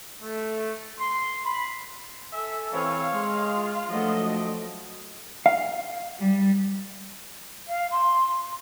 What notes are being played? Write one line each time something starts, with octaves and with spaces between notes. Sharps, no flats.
A3
C6
B5
A4 E5 G#5 E6
E3 C4 C#5 F5
G#3 C6
F4
F3 F#3 A3 D4 F#4 B4 D#5 F#5
G5 A5
F5
G3
F5
C6